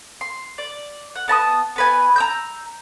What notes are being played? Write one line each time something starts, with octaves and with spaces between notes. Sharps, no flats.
C6
D5
F#5
B3 A5 B5 D#6
B3 B4 G#5
A#5 E6 G6